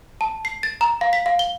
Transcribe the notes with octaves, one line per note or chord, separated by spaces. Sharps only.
A5
C7
A6
A#5
F5
B6
F5
G7